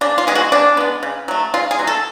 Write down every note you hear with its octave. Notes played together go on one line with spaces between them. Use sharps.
C#3 D4
F4
G#3 B3 G#4
F#4
C#3 D4
G#3 B3
C#3
F#3 A3
C#3 F4
G#4
F#3 A3
A4